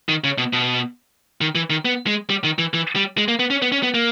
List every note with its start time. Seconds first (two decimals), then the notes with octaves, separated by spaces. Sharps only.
0.09 D#3
0.24 C#3
0.38 B2
0.53 B2
1.41 D#3
1.55 E3
1.70 D#3
1.85 B3
2.07 G#3
2.30 G3
2.44 D#3
2.59 E3
2.74 E3
2.96 G3
3.18 G#3
3.28 A#3
3.39 B3
3.50 C#4
3.62 B3
3.72 C#4
3.83 B3
3.94 A#3